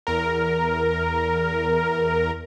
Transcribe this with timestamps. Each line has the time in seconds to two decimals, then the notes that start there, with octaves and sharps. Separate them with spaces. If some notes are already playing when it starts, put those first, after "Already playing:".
0.07 E2 A#4